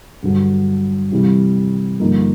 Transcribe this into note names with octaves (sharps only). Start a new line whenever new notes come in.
G2 D3 F#3
C3 E3 G3
G2 D3 F3 A#3 D#4